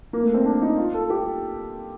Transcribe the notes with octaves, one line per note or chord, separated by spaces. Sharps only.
A#3
A3
C4
D4
D#4
F4
A4
G4